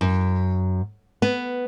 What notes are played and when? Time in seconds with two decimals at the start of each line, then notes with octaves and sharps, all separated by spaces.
0.01 F#2
1.22 B3